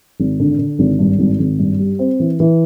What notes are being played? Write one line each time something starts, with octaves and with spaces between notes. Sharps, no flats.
G#1
D3
D3
G#1
G2
G#1
G#1
G2
G3
C4
E3
E3